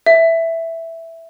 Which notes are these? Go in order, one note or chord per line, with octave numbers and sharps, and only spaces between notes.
E5